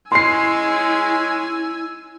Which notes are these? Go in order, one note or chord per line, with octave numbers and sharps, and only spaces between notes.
G#3 C#4 E4 G#5 C6 E6 C7